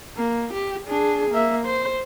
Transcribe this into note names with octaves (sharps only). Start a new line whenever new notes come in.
A#3
G4
D4 G#4
A#3 E5
C5